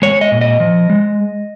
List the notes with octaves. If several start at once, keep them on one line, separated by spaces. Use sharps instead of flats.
G#3 C#5
D#5
A#2
D#5
F3
G#3